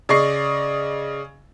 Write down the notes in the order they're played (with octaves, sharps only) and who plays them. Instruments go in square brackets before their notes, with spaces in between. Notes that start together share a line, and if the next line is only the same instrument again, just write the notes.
[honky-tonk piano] C#3 D5 D#5 C#6 C7